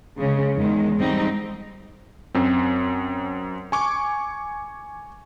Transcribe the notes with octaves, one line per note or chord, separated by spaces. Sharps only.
C#3 G#3
E2 D#3 G#3
G#2 G3 C4 D#4
F#2 C4
G#5 C#6 D6